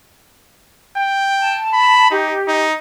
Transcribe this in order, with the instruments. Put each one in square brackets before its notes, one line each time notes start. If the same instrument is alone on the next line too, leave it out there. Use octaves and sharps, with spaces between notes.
[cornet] G5
[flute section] A5
[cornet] B5
[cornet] D#4 [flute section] G4
[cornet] D#4